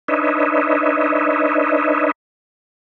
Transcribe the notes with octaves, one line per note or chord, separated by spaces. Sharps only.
D4 D#4 B4 C#5 D#5 E5